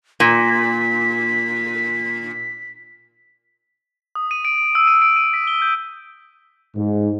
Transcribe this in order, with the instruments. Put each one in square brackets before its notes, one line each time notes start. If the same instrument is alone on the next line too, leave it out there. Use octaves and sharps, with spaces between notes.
[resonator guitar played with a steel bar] A#2 [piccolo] B6
[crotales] D#6
D#7
D7
D7
E6
D#7
D7
D#7
B6
G7
G6
[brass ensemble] G#2